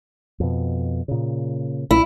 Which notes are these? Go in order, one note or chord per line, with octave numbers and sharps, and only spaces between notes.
F2 B2
A#2 C#3
B1 A#2 E4